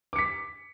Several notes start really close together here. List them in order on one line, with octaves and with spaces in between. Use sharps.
D6 C#7 B6